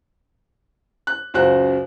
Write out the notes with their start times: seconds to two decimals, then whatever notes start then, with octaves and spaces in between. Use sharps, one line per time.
1.07 F#6
1.34 C#2 F#2 F#4 C5 F#6